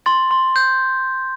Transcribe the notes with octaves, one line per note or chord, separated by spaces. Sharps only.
C6 A6
C6
G6